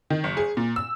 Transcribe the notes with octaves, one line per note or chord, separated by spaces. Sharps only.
D#3
F#1
G#4
A#2
E6